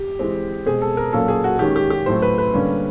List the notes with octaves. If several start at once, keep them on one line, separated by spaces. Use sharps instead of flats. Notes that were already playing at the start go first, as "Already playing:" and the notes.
Already playing: G4
E3 G#3 C4
B2 G#3 C4 G#4
A4
A#4
A#2 F#3 A#3 C#4 A4
G#4
F#4
D#3 G#3 C#4 G4
G4
G4
A2 F#3 A3 C4 C5
B4
B4
D3 G3 A#3 C#4